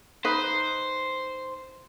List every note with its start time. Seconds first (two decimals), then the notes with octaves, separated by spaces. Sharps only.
0.25 D#4 B4 C5